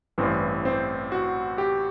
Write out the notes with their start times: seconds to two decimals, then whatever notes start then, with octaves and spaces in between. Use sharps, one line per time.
0.18 A1 G2 E3 C4 C5
0.65 C4 C5
1.12 F#4 F#5
1.58 G4 G5